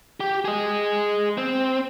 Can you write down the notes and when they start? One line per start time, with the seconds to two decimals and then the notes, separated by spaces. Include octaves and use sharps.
0.20 G4
0.45 G#4 D#5
1.38 C4